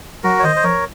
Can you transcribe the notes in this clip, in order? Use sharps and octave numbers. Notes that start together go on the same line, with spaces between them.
F#3 F#4 A#4
C#5
D#3 C5 D#5
C5
F3 A#4 C#5